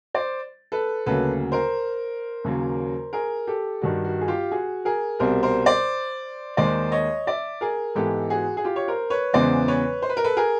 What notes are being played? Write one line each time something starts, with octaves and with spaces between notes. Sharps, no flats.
C5 D5
A4 B4
D2 C#3 F#3 A#3 A4 B4
A#4 C5
D#2 C#3 F#3 A#3
G#4 A#4
G4 A4
G2 D#3 G3 F#4
F#4
G#4
F4 G4
F#4 G#4
G#4 A#4
C2 B2 G3 A#4 C5
A#4 C5
C5 D5
D#2 D#3 G#3 C5 D5
C#5 D#5
D5 E5
G#4 A#4
G#2 E3 G#3 B3 G4 A4
F#4 G#4
G#4
F4 G4
C#5
A#4 C5
B4 C#5
E2 C#3 E3 G#3 B3 C5 D5
B4 C#5
C5
B4
A#4
A4 B4
G#4 A#4